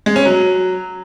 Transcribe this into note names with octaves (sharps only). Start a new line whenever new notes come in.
G#3
C#4
F#3